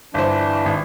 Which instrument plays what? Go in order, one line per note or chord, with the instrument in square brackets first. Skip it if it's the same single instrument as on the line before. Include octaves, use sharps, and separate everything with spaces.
[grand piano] G1 C5 [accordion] E3 D4
[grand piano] G#1